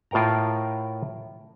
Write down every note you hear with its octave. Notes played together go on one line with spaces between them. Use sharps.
A2 F4 A#4 G5 A#5